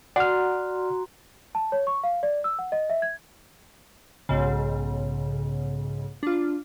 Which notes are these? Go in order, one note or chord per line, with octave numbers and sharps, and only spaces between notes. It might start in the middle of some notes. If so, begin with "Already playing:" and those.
F#4 D5 F#5 A#5 C6 F6
A5
C#5
C#6
F5
D5
E6
F#5
D#5
E5
G#6
B1 G#2 C#3
D4 F4